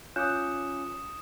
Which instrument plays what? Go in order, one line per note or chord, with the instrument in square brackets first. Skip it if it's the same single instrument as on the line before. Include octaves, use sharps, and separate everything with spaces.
[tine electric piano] C#4 [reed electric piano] F4 D6 [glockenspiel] D#6 C#7 E7 [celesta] F#6 G6